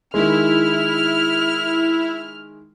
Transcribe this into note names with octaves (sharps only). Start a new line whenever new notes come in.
D#3 G#3 E4 F6